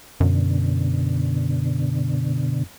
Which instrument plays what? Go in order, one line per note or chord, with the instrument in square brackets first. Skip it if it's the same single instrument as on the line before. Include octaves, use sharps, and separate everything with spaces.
[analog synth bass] F#2 [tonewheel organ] B2 D3